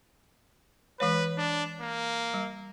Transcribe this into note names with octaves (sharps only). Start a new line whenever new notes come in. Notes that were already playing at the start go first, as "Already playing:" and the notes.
E3 G#3 B4 C#5
D4
A#3
G3